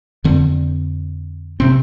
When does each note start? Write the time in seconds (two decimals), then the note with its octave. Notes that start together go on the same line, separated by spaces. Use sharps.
0.24 F2 D3 C4
1.60 C3 C4